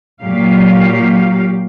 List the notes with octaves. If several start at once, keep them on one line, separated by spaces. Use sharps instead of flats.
A#2 F#3 G4 F5